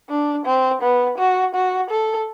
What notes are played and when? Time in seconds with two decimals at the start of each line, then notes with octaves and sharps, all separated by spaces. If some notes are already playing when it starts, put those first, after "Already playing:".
0.10 D4
0.46 C4
0.82 B3
1.18 F#4
1.55 F#4
1.91 A4